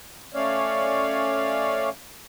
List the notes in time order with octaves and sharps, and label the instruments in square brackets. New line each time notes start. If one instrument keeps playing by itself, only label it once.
[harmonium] A3 C#4 C#5 D5 F5